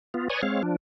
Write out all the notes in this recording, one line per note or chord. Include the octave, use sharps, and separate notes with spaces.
B3 F4
B4 C#5 D5 G#5 C#6 D#6
G#3 C4 C#5 F5
F3 D4